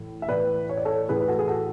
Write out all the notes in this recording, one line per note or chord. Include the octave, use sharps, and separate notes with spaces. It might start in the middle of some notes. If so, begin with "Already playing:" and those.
Already playing: A2 E3
E5
A2 E3 B4 D5
C#5
D5
A4 C#5
A2 E3 G#4 B4
B4
F#4 A4
G#4
F#4 A4